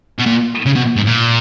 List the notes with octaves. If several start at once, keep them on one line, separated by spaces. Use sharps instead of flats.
B2
A#2
C#3
B2
G#2
A#2